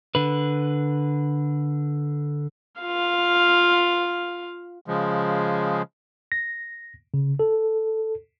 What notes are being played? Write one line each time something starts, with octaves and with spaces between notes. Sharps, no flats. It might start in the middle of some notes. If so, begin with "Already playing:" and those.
D3 B4
F4 F5
C#3 F3 G#3
A#6
C#3
A4